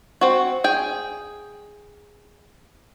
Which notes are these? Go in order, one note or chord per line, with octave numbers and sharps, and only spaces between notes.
C4 F#4
G#4 G5